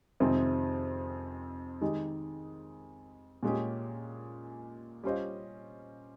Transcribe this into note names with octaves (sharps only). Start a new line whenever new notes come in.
F2 C3 D#3 G#3 C4
D#3 G#3 D#4 G4
A#2 G#3 C#4 G4
G3 C#4 F4 C5 D#5